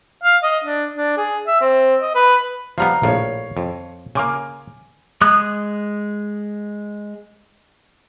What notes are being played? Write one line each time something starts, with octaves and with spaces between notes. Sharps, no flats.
F5
D#5
D4
D4
G#4
E5
C4
D#5
B4
F3 G3 B3 F5 A#5 F6
A#1 A2 C#5 F5
F2
C#3 A#3 G#5 D6 F6
G#3 D#6 F#6